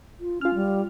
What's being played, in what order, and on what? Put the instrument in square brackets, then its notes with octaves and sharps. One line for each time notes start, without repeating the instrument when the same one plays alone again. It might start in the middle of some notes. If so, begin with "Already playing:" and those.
[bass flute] F4
[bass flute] C#4 [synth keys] F4 F6
[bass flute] G3